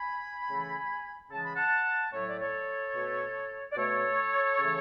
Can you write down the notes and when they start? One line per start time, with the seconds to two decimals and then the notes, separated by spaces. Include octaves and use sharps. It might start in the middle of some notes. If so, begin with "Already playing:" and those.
Already playing: G#5 B5
0.49 C#3 E3 A3
1.31 C#3 E3 G#3 A5
1.43 B5
1.55 F#5 A5
2.13 A2 F#3 A3 C#5
2.25 D5
2.38 A4 C#5
2.94 B2 A3
3.72 D5
3.77 B2 A3 A4 C#5
4.59 C#3 E3 A3